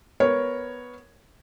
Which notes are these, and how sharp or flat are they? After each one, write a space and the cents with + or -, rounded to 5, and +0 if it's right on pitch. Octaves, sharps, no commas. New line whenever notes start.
B3 +0 A#4 +0 C#5 +0